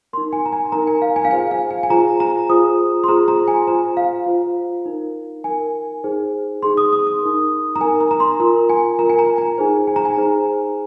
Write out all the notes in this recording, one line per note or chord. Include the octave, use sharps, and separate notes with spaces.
D#4 A#4 C6
G#5
A#5
G#5
D#4 A#4 A#5
G#5
F5
G#5
F5
F4 G#4 C5 G#5
F5
G#5
G#5
F4 G#4 C5 A#5
A#5
F4 G#4 C5 D#6
C6
F4 G#4 C5 A#5
A#5
G#5
F4 C5 A#5
F5
F4 C5
D#4 A#4
D#4 A#4 G#5
D#4 G#4 C5
D#4 G#4 C5 C6
D#6
D#6
D#6
D#4 A#4
A#5
D#4 A#4 G#5
A#5
A#5
C6
F4 A#4 A#5
G#5
F4 A#4 A#5
G#5
A#5
G#5
D#4 G#4 C5
G#5
A#5
G#5
D#4 G#4 C5